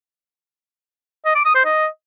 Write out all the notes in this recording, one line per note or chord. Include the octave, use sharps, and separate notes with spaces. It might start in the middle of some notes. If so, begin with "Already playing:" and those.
D#5
D6
D#6
C5
D#5